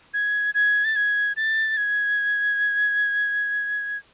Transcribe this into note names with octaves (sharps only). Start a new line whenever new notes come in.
G#6
G#6
A6
G#6
A6
G#6